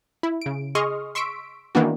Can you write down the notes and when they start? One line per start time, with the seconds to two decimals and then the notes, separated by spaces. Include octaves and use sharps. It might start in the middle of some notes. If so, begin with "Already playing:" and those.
0.23 E4
0.42 C#3 D7
0.75 G#4 D#5 C6 C#6 D#6 F6
1.15 C6 C#6 E6 B6 D7
1.75 D#3 E3 A#3 B3 D4 F#4